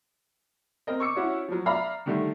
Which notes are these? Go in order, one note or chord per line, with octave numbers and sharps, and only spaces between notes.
C4 A#4 D#5
C#6 D6 E6 C#7
C#4 E4 F#4 C#5
F3 F#3
D5 E5 F5 A#5 B5
D3 D#3 G3 A3